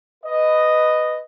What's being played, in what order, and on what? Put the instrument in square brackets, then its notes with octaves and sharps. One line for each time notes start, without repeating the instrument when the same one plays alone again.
[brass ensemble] B4 D#5